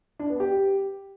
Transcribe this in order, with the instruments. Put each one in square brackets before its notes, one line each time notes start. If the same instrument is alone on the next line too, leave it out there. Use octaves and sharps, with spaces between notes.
[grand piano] D4
B3
G4